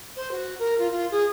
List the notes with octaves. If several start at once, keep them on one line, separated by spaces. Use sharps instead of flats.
C5
F#4
A#4
F4
F4
G#4